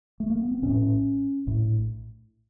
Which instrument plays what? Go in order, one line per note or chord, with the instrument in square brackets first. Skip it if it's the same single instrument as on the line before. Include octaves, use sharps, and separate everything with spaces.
[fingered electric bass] A3
A#3
B3
C4
A#1 A2 C#4
A#1 A2